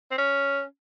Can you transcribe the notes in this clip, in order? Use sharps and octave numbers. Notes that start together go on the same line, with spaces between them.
C4
C#4